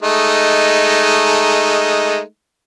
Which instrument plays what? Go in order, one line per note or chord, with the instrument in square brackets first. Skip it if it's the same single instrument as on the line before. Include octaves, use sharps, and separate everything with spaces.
[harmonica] G#3 A3 D#4